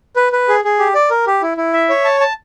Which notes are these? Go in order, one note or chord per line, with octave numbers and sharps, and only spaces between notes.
B4
B4
G#4
G#4
G4
D5
A#4
G4
E4
E4
E5
C#5
A5
A5